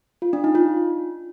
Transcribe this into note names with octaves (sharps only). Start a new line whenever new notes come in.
F4
D4
D#4
F4